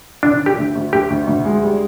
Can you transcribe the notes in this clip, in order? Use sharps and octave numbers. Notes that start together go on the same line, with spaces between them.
D3 D4
D3
G4
D2
D2
D2 G4
D2
D2
G#3
G3